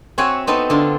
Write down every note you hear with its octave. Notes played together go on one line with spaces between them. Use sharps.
C4 F#4 C#5 E5 F#5 G#5
B3 C4 D#4 A4 E5
D3 D4 F4